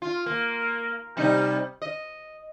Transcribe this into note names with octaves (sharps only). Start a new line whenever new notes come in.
F4
A#3
C3 G3 D#4
D#5